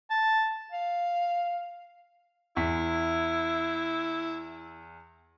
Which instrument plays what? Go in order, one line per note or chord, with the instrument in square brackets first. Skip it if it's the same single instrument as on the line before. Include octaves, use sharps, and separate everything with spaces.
[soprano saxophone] A5
F5
[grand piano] E2 B6 [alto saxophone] E4